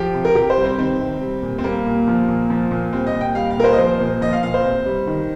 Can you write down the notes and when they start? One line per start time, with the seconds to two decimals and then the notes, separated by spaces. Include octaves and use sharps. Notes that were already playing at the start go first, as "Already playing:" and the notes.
Already playing: F3 G4
0.14 C3
0.25 A#4
0.35 C3 G4
0.50 C5
0.57 G3
0.64 C4
0.78 D#3 C4
1.00 C3
1.21 G3
1.42 A#2
1.59 C4
1.64 G3 A#3
1.86 A#2
2.08 F3
2.28 A#2
2.50 F3
2.71 A#2
2.93 G3 C4
3.07 D#5
3.15 A#2
3.21 G5
3.35 G3 F5
3.51 F5
3.57 A#2 A#4
3.64 C5
3.73 D#5
3.78 F3 C5
4.00 A#2
4.21 F3 D#5
4.33 F5
4.43 A#2 F5
4.54 C5
4.64 C3
4.86 G3
5.07 D#3